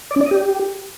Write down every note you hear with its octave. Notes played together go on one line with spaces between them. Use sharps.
D5
C#4
D5
D#5
G4